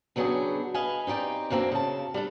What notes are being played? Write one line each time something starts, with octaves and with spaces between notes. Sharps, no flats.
C#3 F#3 B3 D4 G4 G#4
B4 D#5 F5 G#5
C4 D#4 G4 D5
F#2 D#3 A#3 C4 D4 E4
C#3 A5
G3 D4 A4